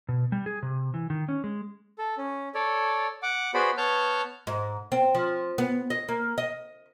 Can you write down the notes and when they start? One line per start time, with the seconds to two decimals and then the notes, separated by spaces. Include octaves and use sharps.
0.09 B2
0.32 G3
0.46 G#4
0.63 C3
0.94 E3
1.10 D#3
1.29 C#4
1.44 G#3
1.98 A4
2.18 C#4
2.55 A4 C#5 D5
3.23 F#5 D6
3.54 B3 F#4 G#4 C5 D5 B5
3.77 B3 C#5 A5 F6 G6
4.47 G#2
4.92 C4
5.15 F3
5.58 B3
5.90 D#5
6.08 A#3
6.38 D#5